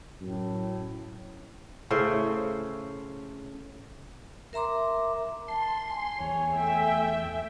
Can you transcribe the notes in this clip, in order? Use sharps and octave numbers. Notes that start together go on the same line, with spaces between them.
F#2 A2
A2 C#3 C5 E5
A#4 E5 A#5 C6 D6
A5 C6
G#5
E2 C#5
A3 E5 G5